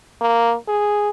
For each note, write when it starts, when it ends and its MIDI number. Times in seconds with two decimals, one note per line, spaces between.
0.21 0.55 58
0.68 1.10 68